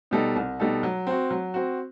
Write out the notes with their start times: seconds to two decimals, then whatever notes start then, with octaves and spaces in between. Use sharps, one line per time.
0.11 B2 G3 D#4 A4
0.36 C2
0.60 B2 G3 D#4 A4
0.83 F#3
1.07 C4 F#4
1.30 F#3
1.54 C4 F#4